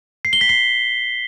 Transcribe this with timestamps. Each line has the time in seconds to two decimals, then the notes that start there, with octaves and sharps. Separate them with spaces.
0.25 C7
0.33 G7
0.41 B6
0.49 C7